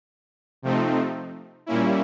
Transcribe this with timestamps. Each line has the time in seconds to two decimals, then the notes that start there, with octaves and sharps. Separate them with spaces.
0.62 C3 F3 A3 C4 D#4
1.66 A#2 G3 A#3 C#4 E4